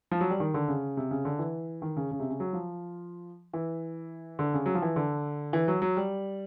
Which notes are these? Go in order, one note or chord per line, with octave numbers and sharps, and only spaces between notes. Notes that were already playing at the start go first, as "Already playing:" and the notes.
F3
F#3
G3
D#3
D3
C#3
C3
C#3
D3
E3
D#3
C#3
C#3
C3
C#3
F#3
F3
E3
D3
C#3
F#3
F3
E3
D3
E3
F#3
F#3
G3